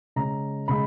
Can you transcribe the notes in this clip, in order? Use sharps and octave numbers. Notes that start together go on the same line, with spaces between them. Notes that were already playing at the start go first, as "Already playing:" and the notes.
C#3 G#3 C#4 A#5
C#3 G#3 B5